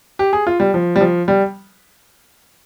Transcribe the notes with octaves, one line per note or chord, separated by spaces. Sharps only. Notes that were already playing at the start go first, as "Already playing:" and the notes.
G4
G#4
F4
G3
F3
G3
F3
G3